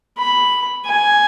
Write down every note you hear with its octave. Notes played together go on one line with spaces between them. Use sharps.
B5
G#5